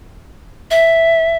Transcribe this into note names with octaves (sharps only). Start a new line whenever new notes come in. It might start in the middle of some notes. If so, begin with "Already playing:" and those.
E5